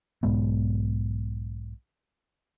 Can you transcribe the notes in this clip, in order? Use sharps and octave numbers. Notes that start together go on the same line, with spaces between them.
B1 G#2 G#3 B3